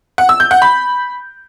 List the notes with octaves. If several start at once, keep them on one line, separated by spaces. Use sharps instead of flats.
F#5
E6
G6
F#5
B5